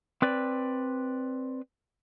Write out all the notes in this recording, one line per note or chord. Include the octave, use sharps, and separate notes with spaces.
C4 B4 D5